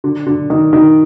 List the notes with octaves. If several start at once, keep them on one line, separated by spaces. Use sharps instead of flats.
D3
D3
D#3
D#3